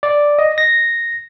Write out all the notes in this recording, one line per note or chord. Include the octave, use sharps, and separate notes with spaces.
D5
D#5
A#6